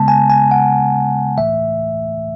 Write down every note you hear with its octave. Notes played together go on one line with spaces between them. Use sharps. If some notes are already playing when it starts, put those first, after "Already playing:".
Already playing: C#3 G#3 B3 A5
G#5
G#5
F#5
A2 E3 A3 E5